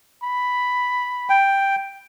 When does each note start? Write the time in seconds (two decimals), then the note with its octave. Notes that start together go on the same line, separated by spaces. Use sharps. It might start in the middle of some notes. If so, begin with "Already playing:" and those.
0.23 B5
1.30 G5